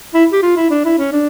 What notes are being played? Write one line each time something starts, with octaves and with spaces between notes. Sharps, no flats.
E4
G4
F4
E4
D4
E4
C#4
D4